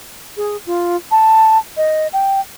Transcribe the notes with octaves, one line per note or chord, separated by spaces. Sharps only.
G#4
F4
A5
D#5
G5